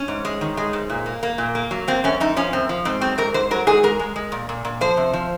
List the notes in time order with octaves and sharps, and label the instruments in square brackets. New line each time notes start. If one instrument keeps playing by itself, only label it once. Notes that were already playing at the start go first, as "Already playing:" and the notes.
Already playing: [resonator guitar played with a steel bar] C#4
G#2
G#3
D#3
G#3
G#2
A#2
A#3
A#3
A#2
A#3
F#3
A#3 C4
F#2 C#4
F#2 D#4
F3 C#4
F#2 C4
F3
G#2 C4
F#3 C4
G#2 A#4
G#2 C5
F#3 A#4
G#2 G#4
G#3 A#4
G#3
G#3
A#2
A#2
A#2
F3 C5
C3
F3